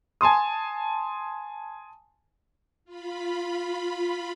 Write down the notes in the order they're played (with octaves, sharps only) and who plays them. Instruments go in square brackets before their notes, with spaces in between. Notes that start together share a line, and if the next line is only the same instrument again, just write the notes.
[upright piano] G#5 A5 C6 D#6
[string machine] F4 B5